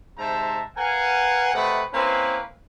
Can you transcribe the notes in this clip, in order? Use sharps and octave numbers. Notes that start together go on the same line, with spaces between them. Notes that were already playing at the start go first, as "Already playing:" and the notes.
G#2 C3 C5 E5 A5 A#5
A#4 B4 F5 F#5 G#5
C3 A3 A#4 B4 D#5 F#5
A#3 C4 C#4 E4 B4